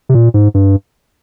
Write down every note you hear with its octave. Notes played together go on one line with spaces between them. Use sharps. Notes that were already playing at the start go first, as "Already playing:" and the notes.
C3
A#2
G#2
G2